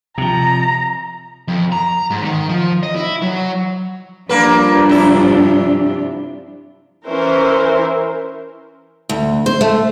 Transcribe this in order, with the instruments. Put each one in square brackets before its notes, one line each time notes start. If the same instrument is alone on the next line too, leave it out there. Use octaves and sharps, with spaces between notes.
[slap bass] C3 F3 [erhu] A#5
[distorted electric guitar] F2
A#5
G#2
D#3
F3
D#5
E4
F#3
[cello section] G2 F3 D4 [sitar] A#3 B4
[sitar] C3 E4
[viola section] E3 C#4 A#4 C5 E5
[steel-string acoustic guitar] D2
C5
A3